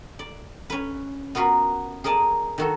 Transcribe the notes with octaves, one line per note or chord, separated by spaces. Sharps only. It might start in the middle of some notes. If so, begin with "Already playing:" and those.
D5
C#4 B4
B3 F4 F#4 A#4 B4
G#4 A#4 D5 D#5 A5
D#3 F#4 A4